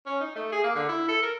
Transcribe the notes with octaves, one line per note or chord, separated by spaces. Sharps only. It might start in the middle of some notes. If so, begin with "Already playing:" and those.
C#4
D#4
A3
G#4
A#3
D3
E4
A4
A#4